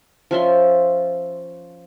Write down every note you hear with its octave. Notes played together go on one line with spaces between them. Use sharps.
F3 C#4 E5 C6